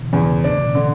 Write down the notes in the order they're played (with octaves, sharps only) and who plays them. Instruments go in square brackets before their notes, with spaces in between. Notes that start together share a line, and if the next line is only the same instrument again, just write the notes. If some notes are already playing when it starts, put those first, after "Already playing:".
Already playing: [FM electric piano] B2 D3 E3
[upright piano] E2 [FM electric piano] C#3
[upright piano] D4
[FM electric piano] A2
B2
[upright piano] D3